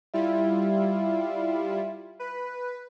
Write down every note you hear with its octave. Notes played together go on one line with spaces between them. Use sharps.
G3 E4 F4 E5
B4